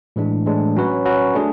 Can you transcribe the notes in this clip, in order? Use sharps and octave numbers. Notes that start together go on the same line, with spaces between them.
A2 E3 G#3 D4
A2 E3 G#3 D4
F#3 C#4 F#4 B4
F#3 C#4 F#4 B4
A3 D4 G#4